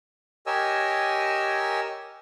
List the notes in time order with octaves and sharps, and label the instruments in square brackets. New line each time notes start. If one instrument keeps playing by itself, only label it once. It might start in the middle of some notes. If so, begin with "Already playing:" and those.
[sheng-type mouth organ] G4 A#4 C#5 D#5 G#5 E6